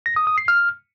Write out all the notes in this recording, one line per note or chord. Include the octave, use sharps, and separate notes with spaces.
A#6
D#6
D#6
C7
F6